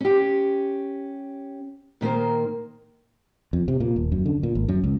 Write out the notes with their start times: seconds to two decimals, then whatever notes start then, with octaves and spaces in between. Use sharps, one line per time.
0.01 C#4 G4
2.01 A#2 D#3 A#3 C5
3.53 F2
3.68 C3
3.80 A#2
3.96 D#1
4.12 F#2
4.26 D3
4.43 A#2
4.55 G#1
4.68 F#2
4.84 C#2